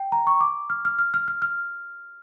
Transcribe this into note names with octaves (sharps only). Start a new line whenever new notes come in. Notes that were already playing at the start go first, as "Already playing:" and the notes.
Already playing: G5
A#5
C#6
D6
F6
F6
F6
F6
F6
F6